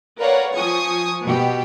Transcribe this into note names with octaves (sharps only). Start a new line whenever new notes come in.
A#4 B4 C#5 D5 F5 F#5
F3 G#5 C#6 D#6
B2 G4